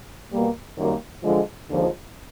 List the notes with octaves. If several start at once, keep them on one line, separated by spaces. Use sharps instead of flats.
B2 G3 A#3
F#2 D#3 G3 A#3
D3 F3 G#3
D#2 D3 F3 G#3